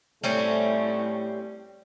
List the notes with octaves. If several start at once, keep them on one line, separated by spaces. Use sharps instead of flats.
A2 G3 A3 C4 C#4